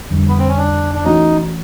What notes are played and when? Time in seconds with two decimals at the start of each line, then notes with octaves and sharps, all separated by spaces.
0.10 F2 D3 G3
0.29 B3
0.39 C4
0.48 C#4
0.58 D4
0.95 D4
1.04 E3 A3 C#4 D#4 F#4